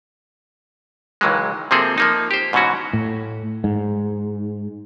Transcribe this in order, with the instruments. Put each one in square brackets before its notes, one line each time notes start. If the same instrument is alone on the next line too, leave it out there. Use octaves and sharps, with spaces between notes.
[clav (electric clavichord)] C#2 D#3 E3 F#3 G#3
C3 F3 A#3 C4 G#4 A4
F3 A#3 D#4
G4 C5
G#2 B2 E3 C#4 F#4
[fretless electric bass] A2
G#2